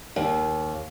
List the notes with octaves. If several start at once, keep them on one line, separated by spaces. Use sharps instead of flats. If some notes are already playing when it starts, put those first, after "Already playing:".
D#2